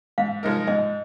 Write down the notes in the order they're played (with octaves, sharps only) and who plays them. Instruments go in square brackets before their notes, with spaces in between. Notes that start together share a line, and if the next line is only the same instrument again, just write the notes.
[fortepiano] G#2 [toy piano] F5
[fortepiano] F3 G#3 D#4 A#4
[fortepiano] G#2 [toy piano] D#5